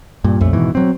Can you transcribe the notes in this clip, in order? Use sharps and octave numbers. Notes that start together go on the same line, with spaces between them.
G2 A#2
B1 F2 A#2 A3
G#2 B2 D#3 E3
F#3 C4